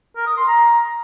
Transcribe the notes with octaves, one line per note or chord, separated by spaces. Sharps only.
A#4
D#6
C6
A#5